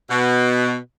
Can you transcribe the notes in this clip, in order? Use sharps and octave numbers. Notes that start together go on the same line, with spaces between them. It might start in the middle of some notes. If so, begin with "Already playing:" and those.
B2